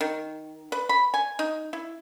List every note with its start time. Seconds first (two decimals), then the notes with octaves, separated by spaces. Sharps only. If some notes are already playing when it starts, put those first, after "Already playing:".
0.01 D#3
0.72 B4
0.89 B5
1.14 G#5
1.39 D#4
1.73 E4